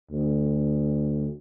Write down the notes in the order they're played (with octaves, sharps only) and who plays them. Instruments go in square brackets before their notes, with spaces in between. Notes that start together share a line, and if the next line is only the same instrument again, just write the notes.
[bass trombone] D2